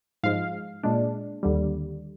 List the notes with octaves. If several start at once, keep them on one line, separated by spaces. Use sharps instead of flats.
G#2 F3 G#3 F5
A#2 G#3 D4
D#2 D3 G3